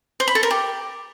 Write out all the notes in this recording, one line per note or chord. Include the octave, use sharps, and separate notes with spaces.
C5
B5
A4
A#4
G4